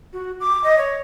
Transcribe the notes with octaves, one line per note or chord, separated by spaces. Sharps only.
F#4
D6
D#5
C#5